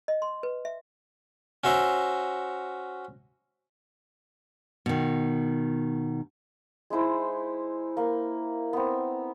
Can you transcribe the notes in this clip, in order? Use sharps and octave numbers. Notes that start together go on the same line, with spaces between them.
D#5
C6
B4
E5
C#4 F#4 C5 E5 A#5
B2 D#3
G#3 D#4 E4 C5
A#3
B3 C4